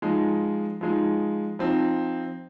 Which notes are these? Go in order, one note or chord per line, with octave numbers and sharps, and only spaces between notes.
F3 G#3 D#4
F3 G#3 D#4
F3 C4 D#4